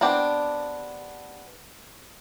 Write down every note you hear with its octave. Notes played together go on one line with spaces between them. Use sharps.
B3 C4 D4 G4